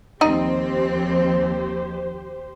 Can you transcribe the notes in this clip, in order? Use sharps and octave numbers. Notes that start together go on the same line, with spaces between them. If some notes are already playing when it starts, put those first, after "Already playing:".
D#2 F3 C4 D#4 G4 C5 D5 D#5